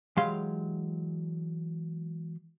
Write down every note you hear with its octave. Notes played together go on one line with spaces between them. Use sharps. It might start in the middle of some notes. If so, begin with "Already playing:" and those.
E3 F#3 G#3 G4 F5 C6